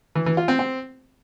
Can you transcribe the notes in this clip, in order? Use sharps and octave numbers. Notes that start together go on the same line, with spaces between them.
E3
E3
F4
C4
C4